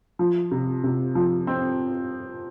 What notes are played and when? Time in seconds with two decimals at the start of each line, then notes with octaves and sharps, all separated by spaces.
0.19 F3
0.51 C3
0.84 C3
1.15 F3
1.47 C4